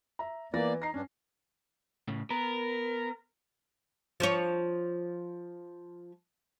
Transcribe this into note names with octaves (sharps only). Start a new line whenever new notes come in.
E5 A#5
E3 A#3 B3 D5 A#6
D#4 A#6 C7
G2 C#4 D4
A2 C#3
B3 A#4
F3 F4 C#5